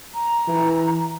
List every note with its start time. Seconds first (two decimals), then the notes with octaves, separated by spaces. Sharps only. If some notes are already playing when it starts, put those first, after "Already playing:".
0.14 A#5
0.48 E3